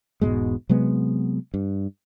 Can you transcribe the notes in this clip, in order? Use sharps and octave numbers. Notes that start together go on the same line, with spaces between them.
E1 G#2 B2 G#3
C3 F#3 G#3 B3
G2